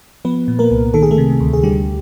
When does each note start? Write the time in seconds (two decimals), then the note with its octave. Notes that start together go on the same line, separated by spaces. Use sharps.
0.25 F3 B3 B4
0.48 A#2
0.59 A#3 A#4
0.71 C2
0.94 D#3 A4
1.02 G#4
1.11 A3 A4
1.18 C3
1.40 D2
1.53 G#4
1.63 D3 G3 G4